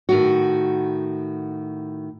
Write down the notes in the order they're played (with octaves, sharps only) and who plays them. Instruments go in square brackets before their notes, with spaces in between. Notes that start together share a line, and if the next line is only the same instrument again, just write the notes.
[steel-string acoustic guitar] A2 D#3 F#4